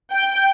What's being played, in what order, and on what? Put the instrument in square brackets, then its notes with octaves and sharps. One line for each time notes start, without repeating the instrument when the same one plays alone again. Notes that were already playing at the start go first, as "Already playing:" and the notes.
[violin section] G5